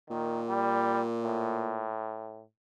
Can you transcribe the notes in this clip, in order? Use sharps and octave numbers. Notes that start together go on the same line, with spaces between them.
A#2 D#3
G3
A2